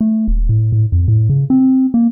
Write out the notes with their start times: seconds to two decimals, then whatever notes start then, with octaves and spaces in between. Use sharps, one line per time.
0.01 A3
0.28 D#1
0.49 A2
0.72 A2
0.92 F2
1.08 A2
1.29 C#3
1.50 C4
1.94 A#3